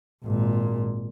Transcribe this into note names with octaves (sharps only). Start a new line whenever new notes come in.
G#1 A#2